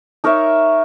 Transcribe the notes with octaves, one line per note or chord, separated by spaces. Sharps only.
D#4 A#4 C#5 E5